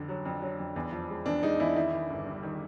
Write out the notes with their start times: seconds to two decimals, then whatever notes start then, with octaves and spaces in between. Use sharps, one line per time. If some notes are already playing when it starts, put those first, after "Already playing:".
Already playing: F2 D3
0.09 F#3
0.25 F2 D4
0.42 F#3
0.59 F2
0.76 E2
0.92 F3
1.09 G#3
1.26 E2 D4
1.43 G#3 D#4
1.60 E2 E4
1.76 D#3 E4
1.93 D#3
2.10 G1
2.27 G2
2.43 D#3